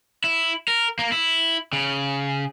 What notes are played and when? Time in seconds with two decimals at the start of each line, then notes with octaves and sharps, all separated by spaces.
0.24 E4
0.68 A#4
0.99 A#3
1.12 E4
1.73 C#3